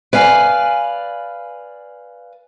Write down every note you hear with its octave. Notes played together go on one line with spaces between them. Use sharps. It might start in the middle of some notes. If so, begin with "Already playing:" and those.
B4 D5 F5 G#5